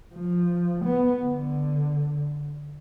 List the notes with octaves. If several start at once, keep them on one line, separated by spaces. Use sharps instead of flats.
F3
B3
D3